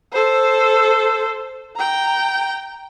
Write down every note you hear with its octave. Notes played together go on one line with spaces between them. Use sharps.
A4 C5
G5 A#5